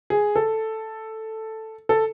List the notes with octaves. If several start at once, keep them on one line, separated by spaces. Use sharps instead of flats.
G#4
A4
A4